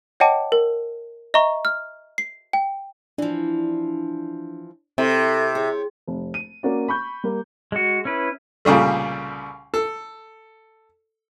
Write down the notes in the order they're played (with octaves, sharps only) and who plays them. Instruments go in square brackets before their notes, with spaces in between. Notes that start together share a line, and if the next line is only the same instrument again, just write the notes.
[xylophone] C#5 D#5 F#5 G5 A5 D6
A#4
D#5 E5 A#5 C#6
F6
C7
G5
[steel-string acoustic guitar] E3 F3 [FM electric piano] D4
[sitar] C3 [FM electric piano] C4 [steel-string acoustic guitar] E4 [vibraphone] A4
[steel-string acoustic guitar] G4 C#5 [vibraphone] G#4
[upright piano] F1
D#7
A#3 C#4 F#4 D5
B5 C#6 G6
G3 A#3
[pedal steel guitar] G#3 F#4
C#4 E4 B4
[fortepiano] C2 A#2 C#3 G3 A3
A4